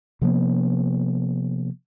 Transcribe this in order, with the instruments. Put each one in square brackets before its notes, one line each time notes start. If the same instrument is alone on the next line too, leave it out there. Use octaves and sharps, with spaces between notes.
[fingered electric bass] C3 F3 A#3 B3